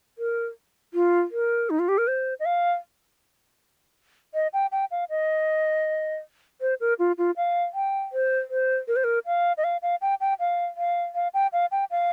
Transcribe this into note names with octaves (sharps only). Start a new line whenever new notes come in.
A#4
F4
A#4
D#4
F4
G4
A#4
C5
D#5
F5
D#5
G5
G5
F5
D#5
C5
A#4
F4
F4
F5
G5
C5
C5
A#4
C5
A#4
F5
D#5
F5
F5
G5
G5
F5
F5
F5
G5
F5
G5
F5